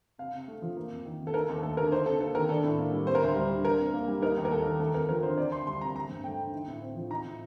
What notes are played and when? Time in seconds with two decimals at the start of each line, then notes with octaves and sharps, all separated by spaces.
0.18 C3 F5
0.33 C3
0.48 A3
0.62 F3
0.77 A#3
0.91 F2
1.05 D#3
1.19 C3
1.27 A4
1.34 D#4 A#4
1.49 D#2 A4
1.63 A3 A4
1.77 D3 A#4
1.92 D#4 C5
2.06 C3 A4
2.21 A#3 A4
2.35 D#3 A#4
2.49 D4 A4
2.64 A2
2.79 A#3
2.92 G3
3.07 C4 C5
3.15 A#4
3.22 D2 C5
3.35 G3
3.50 D3
3.64 D4 A#4
3.79 C3
3.93 A#3
4.08 G3
4.22 D#4 A#4
4.37 D#2
4.45 A#4
4.51 A#3 A4
4.66 D#3
4.79 A3 A4
4.94 F2 A#4
5.09 F3 A#4
5.23 D3 C5
5.37 C4 D5
5.52 D2 C6
5.67 G3 C6
5.80 C3 A#5
5.95 C4 A#5
6.09 G2
6.24 A3 G5
6.39 D3
6.52 D#4
6.67 A2
6.82 C4
6.96 F3
7.10 D#4 A#5
7.25 A2